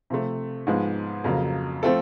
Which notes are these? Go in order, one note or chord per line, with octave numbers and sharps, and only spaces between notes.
C3 F3 A3
G#2 F3 G#3 B3
F2 C#3 F#3 A#3
F3 A3 C4 F4 A4